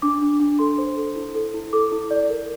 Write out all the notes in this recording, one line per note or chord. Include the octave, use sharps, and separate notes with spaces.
D4 D6
D4
D4
A4 C6
C5
A4
E4
A4
E4
A4 D6
E4
D5
A#4